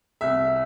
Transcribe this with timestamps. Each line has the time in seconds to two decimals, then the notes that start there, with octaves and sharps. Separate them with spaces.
0.21 C2 E5